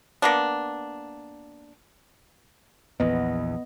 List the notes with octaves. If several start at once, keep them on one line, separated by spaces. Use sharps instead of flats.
A#3 B3 D4
A#1 E2 B3 D#5